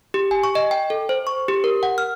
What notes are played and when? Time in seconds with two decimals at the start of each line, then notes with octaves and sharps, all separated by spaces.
0.14 G4
0.31 G#5
0.43 C#6
0.55 D#5
0.71 G5
0.90 A4
1.09 C5
1.27 C#6
1.48 G4
1.64 A#4
1.83 F#5
1.98 F6